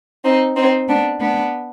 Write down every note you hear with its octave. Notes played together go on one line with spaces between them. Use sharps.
C4 D#4
C4 D#4
B3 D4
B3 D4